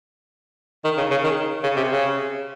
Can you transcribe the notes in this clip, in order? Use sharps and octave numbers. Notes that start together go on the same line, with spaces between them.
D#3
C#3
C#3
D#3
C#3
C3
C#3